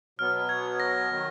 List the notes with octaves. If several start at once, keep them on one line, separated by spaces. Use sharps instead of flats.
B2 F#3 B3 F6
G#6
A#6
D#3 F#3